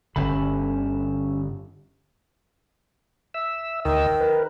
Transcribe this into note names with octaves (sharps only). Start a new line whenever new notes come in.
G1 D3 C#4 E5 B5
E5 E6
D2 D#3 D#5 E6
A#4 B4